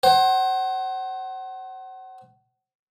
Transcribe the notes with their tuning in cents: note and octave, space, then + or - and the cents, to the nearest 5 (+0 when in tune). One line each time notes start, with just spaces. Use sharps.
C5 +30 F#5 +30